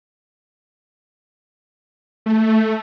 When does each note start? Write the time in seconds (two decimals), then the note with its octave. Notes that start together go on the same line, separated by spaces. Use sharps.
2.26 A3